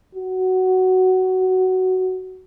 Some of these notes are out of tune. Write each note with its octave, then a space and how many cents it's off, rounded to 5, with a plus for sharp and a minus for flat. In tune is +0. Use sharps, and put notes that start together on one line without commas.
F#4 +10